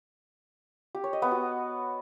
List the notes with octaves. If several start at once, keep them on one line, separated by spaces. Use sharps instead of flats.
G4
C#5
D#5
B3
F#4